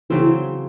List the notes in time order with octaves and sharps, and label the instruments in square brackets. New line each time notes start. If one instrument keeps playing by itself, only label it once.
[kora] C#3 F#3 C4 [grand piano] E3